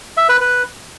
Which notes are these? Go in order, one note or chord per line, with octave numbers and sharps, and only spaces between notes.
E5
B4
B4